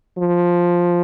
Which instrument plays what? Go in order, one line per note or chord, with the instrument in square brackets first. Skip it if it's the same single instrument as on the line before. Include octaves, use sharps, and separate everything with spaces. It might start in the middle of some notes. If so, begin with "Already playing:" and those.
[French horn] F3